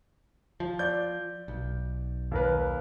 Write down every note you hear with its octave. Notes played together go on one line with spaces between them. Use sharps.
F3
D5 G6
B1
D#2 A#4 B4